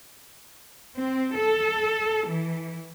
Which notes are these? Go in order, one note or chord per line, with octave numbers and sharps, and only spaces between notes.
C4
A4
E3